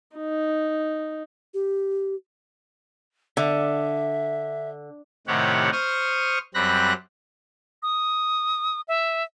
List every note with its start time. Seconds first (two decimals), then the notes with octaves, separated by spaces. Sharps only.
0.16 D#4
1.54 G4
3.37 D3 E5
5.27 A2 C3 D#3 G4 C#5 F#5
5.72 C5 C#6 D#6 F6
6.54 F#2 G3 C4 B5 F#6 A#6
7.83 D#6
8.88 E5